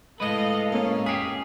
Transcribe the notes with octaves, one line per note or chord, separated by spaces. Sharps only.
A2 G#3 A4 B4 D#5 F5
A#3 C#4
G4 G#4 B6 C7